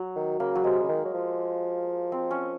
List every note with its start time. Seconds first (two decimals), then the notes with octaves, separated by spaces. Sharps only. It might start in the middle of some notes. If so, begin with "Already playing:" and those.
Already playing: F#3
0.16 D#3
0.40 C#3 A#3
0.55 F#3
0.64 C3 G#3
0.83 C#3
0.88 D#3
1.05 F#3
1.14 F3
2.12 C4
2.31 C#4